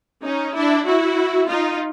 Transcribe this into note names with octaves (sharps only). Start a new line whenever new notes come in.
C#4 D#4
D4 E4
E4 F#4
D#4 F4